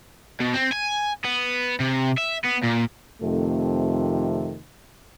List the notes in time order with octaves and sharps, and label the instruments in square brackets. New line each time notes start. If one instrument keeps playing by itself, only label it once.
[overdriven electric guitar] B2
C4
G#5
B3
C3
E5
B3
A#2
[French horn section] F2 C3 D#3 A3